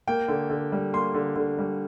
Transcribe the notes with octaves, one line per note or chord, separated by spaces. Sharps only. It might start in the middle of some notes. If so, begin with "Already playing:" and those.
A#3 G5
D3
D3
G3
A#3 C6
D3
D3
G3